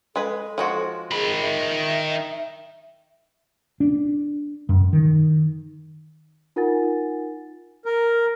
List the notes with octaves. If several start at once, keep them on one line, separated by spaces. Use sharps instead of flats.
G#3 A4 B4
F3 G#3 F#4
D#3 G#4 B5
E5
D4
F#2
D#3
D#4 F4 A#4 F#5 G#5 A6
A#4